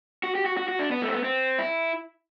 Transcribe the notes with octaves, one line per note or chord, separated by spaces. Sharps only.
F#4
G4
F#4
F#4
F#4
D4
B3
A3
C4
B3
C4
E4